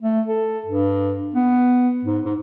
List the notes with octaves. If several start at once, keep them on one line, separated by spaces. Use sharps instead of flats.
A3
A4
G2
B3
G#2
G#2